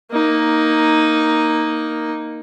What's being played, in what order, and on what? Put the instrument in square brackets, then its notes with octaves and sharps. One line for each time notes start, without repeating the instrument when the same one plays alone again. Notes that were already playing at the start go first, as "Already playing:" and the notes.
[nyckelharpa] A#3 D#4